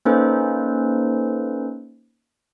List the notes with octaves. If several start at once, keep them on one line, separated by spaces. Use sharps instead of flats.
A#3 C#4 D#4 A4 B4 C5